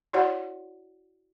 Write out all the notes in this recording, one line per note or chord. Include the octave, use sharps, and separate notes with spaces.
E4 F#4 C#5 D5 F#5